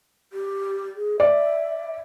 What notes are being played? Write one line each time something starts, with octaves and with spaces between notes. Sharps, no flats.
G4
G#4
D5 E5